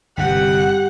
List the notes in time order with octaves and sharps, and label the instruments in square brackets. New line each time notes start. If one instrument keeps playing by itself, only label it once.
[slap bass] G1 C3 [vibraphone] G3 G4 [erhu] F#5